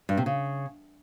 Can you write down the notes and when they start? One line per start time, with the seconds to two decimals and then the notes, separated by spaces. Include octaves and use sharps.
0.09 G2
0.17 C3
0.26 C#3